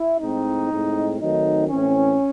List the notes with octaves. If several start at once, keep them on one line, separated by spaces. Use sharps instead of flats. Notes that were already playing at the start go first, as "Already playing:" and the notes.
Already playing: E4
A2 G#3 C4 D#4
A2 G#3 C4
D#3 F#3 A3 C4 D#4
A2 E3 C4 C#4